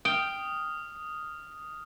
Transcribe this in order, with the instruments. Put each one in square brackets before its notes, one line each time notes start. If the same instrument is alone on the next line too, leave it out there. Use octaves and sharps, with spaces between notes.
[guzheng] G5 [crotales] D#6 F6